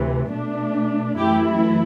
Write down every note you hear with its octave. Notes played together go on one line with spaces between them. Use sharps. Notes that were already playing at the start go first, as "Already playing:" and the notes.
Already playing: D2 C3 E3
B2 A3 D4
F#2 E3 A3 E4 G4